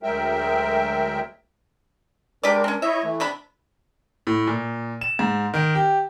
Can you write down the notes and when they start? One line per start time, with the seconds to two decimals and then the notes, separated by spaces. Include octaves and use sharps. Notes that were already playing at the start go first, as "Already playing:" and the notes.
0.03 D2 F#3 G#3 A#4 E5 G5
2.43 G#3 D4 G4 A#4 B4 D5
2.64 C4 C#4
2.82 E4 C#5 D#5 E5
3.04 E3 A3
3.20 C3 D4 B5
4.27 A2
4.47 A#2
5.01 E7
5.19 G#2
5.54 D#3
5.75 G4